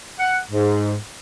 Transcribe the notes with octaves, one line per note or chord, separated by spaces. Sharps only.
F#5
G#2